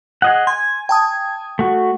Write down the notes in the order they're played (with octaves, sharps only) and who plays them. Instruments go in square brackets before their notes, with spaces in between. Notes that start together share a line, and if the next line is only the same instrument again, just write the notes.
[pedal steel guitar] G#4 D#5 F#5
[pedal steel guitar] G#5 [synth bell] C6
[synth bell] G5 A5 D#6
[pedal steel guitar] A3 F#4